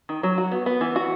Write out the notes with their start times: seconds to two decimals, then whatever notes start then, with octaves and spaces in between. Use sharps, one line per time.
0.09 D#3
0.23 F#3
0.38 F#4
0.52 B3
0.66 B3
0.81 E3
0.96 F#4